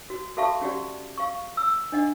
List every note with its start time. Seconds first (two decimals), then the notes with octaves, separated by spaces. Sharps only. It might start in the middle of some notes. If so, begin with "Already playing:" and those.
0.10 F#4
0.37 F#4 A4 E5 F5 A5 C#6
0.61 C#4 F#4 G4 D5 F#5
1.18 F5 C#6
1.57 E6
1.92 D4 D#5 F#5